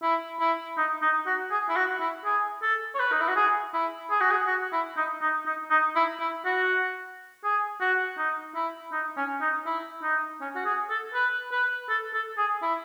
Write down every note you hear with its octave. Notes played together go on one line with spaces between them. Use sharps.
E4
E4
D#4
D#4
F#4
G#4
E4
F#4
E4
G#4
A4
C#5
B4
D#4
E4
F#4
G#4
E4
G#4
F#4
G#4
F#4
E4
D#4
D#4
D#4
D#4
E4
E4
F#4
G#4
F#4
D#4
E4
D#4
C#4
D#4
E4
D#4
C#4
F#4
G#4
A4
B4
B4
A4
A4
G#4
E4